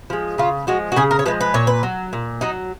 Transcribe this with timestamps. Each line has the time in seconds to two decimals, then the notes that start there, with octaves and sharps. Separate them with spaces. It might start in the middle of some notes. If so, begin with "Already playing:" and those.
0.10 F3 G#3
0.38 C#3 F4
0.67 F3 G#3 F#4
0.92 F#4
0.96 C#3 G#4
1.11 A#4
1.19 C#5
1.26 F3 G#3 B4
1.41 B4
1.54 A#2 C#5
1.67 B4
1.83 F#3
2.13 A#2
2.41 F#3 D#4